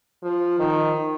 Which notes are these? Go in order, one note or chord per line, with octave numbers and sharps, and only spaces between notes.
F3
D#3